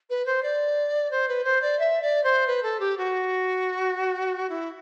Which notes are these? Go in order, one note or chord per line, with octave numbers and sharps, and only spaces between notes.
B4
C5
D5
C5
B4
C5
D5
E5
D5
C5
B4
A4
G4
F#4
E4